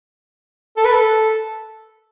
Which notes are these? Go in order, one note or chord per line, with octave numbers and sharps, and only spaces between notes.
A4
B4
A4